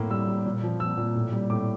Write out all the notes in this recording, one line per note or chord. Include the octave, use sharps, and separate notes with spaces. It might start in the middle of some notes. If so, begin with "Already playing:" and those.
Already playing: A2 A#3
G3 E6
G3
A#2
F3
F3 E6
A#2
A2
G3
A2 D6